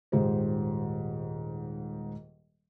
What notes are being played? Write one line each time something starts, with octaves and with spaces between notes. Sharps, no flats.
D#1 G#2 G4 C5